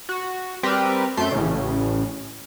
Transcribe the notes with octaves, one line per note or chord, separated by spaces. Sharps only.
F#4
G3 C4 G4 A#4 B4
F#2 A3 C6 G6
A1 A2 C#3